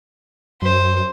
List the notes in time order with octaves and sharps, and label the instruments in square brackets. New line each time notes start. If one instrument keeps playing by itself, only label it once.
[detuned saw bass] F#2 [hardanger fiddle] C5